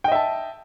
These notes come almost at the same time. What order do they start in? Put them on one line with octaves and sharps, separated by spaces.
G5 D#5 E5 A5